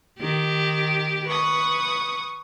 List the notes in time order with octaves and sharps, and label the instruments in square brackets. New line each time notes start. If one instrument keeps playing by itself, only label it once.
[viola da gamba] D#3 G4
[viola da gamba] B4 [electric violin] C#6 D#6